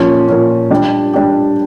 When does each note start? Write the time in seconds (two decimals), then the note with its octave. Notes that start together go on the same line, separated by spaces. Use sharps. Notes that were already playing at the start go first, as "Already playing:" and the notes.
Already playing: A#2 F3 C#4
0.28 A#2 F3 C#4
0.71 G3 D4 G4
1.14 G3 D4 G4